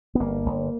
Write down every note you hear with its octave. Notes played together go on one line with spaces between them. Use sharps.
B3
G1 A#3
G1